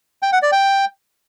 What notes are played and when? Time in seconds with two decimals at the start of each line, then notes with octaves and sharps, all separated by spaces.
0.23 G5
0.32 F#5
0.42 D5
0.52 G5